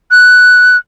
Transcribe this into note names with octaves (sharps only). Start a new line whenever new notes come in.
F#6